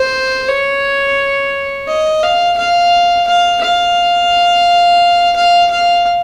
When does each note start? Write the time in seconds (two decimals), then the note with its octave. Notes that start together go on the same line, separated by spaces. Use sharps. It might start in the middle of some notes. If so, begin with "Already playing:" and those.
Already playing: C5
0.48 C#5
1.87 D#5
2.23 F5
2.57 F5
3.28 F5
3.62 F5
5.36 F5
5.71 F5